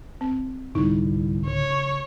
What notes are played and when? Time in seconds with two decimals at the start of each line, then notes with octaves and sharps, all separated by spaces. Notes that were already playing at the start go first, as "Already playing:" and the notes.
0.21 C4
0.75 C2 G#2 D3 G3 D#4 E4
1.46 C#3 C#5